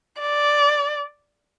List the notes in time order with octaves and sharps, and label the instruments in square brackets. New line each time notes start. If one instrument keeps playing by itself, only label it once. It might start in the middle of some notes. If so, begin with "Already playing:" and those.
[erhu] D5